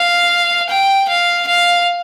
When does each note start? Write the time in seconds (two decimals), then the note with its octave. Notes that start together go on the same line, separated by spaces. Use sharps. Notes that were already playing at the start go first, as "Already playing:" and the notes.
Already playing: F5
0.70 G5
1.09 F5
1.48 F5